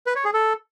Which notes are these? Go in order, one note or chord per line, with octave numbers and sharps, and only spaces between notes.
B4
C#5
G#4
A4